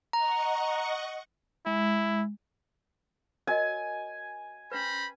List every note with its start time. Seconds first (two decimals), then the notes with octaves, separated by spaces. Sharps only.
0.13 D#5 F#5 A#5 C#6
1.66 G#3 E4
3.47 F#4 A#4 D#5 G#5
4.72 C#4 B4 C5 A#5 B5